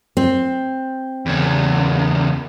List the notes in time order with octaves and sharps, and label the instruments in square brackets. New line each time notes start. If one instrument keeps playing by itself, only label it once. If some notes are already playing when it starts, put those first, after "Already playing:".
[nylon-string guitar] C4
[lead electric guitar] E2 C#3